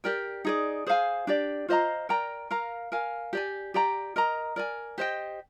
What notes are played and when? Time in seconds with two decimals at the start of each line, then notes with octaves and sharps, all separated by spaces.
0.04 G4 A#4 D5 G5
0.45 D#4 G#4 D5
0.87 G#4 C5 F5 G#5
1.27 D4 G4 D5
1.68 F4 C5 D#5 A#5
2.09 A#4 D5 G5 A#5
2.51 A#4 F5 A#5
2.92 A#4 F5 G#5
3.33 G4 D5 G#5
3.74 G4 D5 G5 A#5
4.16 A#4 D#5 A#5
4.56 A#4 D5 G#5
4.98 G4 C5 D#5 G5